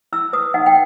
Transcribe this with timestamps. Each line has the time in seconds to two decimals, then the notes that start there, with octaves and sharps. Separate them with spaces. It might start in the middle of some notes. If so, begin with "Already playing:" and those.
0.13 E4 E6
0.33 B4 D#6
0.54 D#4 F#5
0.66 G5